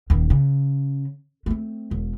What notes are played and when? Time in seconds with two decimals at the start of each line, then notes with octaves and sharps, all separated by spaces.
0.10 D#1 D#3
0.30 C#3
1.46 A3 C4
1.91 E1